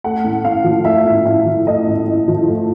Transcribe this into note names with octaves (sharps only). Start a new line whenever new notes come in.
A3 F#5
A2
A2 F5
F3
A3 E5
A2
A2 E5
F3
A3 D#5
A2
A2
F3
A3